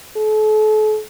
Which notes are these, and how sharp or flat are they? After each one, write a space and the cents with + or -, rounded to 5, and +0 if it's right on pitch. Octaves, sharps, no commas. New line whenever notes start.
A4 -40